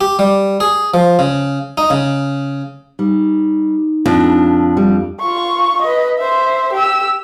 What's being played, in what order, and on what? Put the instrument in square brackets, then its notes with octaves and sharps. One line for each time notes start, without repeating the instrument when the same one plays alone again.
[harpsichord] G4
G3
G#4
F3
C#3
D#4
C#3
[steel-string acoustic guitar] G3 [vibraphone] D#4
[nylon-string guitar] F2 [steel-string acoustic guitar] D4
[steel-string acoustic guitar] G3
[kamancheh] F4 C#6
B4 D#5
C5 E5
G4 E6